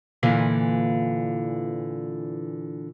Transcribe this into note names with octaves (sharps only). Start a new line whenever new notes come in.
A#2 D3 E3